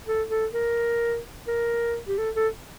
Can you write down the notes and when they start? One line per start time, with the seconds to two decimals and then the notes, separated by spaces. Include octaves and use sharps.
0.07 A4
0.30 A4
0.53 A#4
1.48 A#4
2.08 G4
2.18 A4
2.36 A4